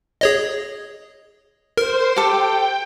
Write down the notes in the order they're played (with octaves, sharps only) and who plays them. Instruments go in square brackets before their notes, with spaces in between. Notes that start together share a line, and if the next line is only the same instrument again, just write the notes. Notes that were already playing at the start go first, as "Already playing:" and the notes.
[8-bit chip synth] G#4 C#5 D#5
[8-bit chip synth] A#4 [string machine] C5 C6
[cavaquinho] G4 A4 [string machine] G5